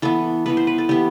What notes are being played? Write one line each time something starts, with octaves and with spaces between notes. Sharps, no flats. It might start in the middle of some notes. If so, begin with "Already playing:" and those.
E3 B3 A4
E3 B3 B4
C5
B4
A4
E3 B3 G4